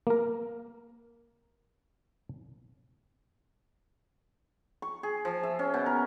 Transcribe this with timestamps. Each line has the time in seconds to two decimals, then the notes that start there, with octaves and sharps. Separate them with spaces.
0.07 A#3 A#4
4.82 C#6
5.03 G#4
5.25 F3
5.43 E5
5.59 C#4
5.74 B2
5.86 A#4